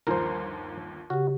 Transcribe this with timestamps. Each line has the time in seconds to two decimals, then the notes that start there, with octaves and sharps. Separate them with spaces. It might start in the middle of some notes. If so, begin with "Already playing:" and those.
0.07 G1 D#2 F3 A#4 C5
1.10 C#3 F#4 G4